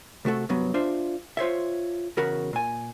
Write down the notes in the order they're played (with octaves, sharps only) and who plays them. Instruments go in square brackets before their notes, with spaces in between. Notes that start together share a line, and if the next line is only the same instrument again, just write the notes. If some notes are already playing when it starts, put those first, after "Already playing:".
[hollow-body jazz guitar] C3 A3 F#4 A4
C2 G2 F#3 B3
D4 F4 C5 E5
F4 C5 C#5 E5
E2 C#3 F#4 A#4 B5
A#2 G#5